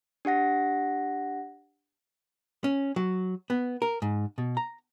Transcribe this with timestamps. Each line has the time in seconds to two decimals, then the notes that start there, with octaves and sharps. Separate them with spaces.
0.25 D4 G4 F#5 A#6
2.64 C#4
2.96 F#3
3.50 B3
3.82 A#4
4.02 G#2
4.38 B2
4.57 A#5